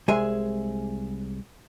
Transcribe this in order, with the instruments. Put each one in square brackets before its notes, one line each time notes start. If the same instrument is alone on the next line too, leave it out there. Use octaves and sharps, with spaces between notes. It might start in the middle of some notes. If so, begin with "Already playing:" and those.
[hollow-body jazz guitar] C2 G#3 G#4 E5 G#5